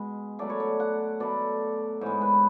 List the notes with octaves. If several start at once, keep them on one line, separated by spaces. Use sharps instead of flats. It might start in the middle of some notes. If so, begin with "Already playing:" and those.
Already playing: B2 G#3
B2 F#3 A3 D5
C#5
D5
F#5
B2 F#3 A3 D5
G#2 E3 G#3 C#5
B4